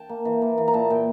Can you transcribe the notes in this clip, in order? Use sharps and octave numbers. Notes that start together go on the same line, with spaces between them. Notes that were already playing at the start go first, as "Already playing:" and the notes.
Already playing: G5 A5
A#3
E3
A#3
E3
A#5
A#2 A5
A#2 G5